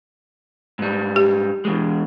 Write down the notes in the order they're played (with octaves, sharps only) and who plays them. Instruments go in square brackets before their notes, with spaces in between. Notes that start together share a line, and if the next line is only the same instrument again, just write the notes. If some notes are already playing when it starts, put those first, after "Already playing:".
[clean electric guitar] G#2 G3
[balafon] G4
[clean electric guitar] E2 G#3